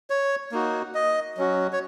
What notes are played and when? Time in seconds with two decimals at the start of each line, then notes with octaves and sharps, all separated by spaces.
0.10 C#5
0.52 A#3 D#4 F#4
0.94 D#5
1.37 F#3 C#4 F#4
1.73 C#5